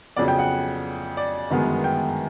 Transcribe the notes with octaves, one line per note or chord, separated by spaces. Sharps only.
F2 C#3 F#3 B3 D5
G5
F#5
D5
G1 F#2 D#3 G#3 B3
G5